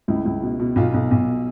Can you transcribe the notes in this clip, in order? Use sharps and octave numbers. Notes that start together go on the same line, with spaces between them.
C#2 E4
C#2
B2
B2
B1 F4
B1
B1